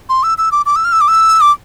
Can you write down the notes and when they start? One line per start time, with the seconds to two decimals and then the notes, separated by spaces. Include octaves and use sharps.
0.09 C6
0.23 E6
0.38 E6
0.52 D6
0.66 D6
0.76 E6
0.85 F6
0.92 E6
1.01 D6
1.08 E6
1.41 D6